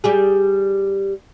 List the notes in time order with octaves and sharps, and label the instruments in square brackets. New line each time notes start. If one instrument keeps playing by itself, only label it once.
[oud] G3 G4 G#4